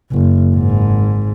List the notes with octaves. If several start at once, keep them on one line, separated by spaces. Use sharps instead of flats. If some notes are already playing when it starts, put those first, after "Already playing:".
F#1
G#1 G#2